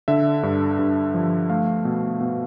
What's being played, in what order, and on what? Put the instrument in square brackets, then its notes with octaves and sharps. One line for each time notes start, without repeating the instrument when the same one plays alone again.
[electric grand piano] D3 E5
G2
G2
F3
A3 F5
B2
B2